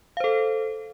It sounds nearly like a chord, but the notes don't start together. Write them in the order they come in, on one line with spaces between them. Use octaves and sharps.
F5 C5 A4